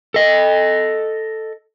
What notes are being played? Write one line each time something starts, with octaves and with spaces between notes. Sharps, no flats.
A4 D#5